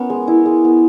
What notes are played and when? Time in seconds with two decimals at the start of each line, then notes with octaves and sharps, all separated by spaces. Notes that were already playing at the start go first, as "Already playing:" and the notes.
Already playing: B3 C#4 A#4
0.10 G#3
0.27 E4
0.46 G#3
0.64 B3